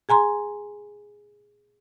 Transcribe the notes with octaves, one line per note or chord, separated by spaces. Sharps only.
G#4 G#5 A#5 C6